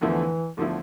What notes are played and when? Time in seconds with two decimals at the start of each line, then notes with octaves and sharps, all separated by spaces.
0.01 E2 D3 E3 F3 A3 E4
0.57 E2 D3 F3 A3 E4